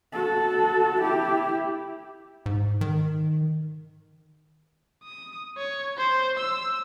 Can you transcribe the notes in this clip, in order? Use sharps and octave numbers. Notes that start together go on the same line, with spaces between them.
F#4 A4
E4 G4
G#2
D#3
D#6
C#5
C5
E6